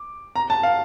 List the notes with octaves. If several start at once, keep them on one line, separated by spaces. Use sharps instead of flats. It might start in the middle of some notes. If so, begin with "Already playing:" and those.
Already playing: D6
A#5
A5
F5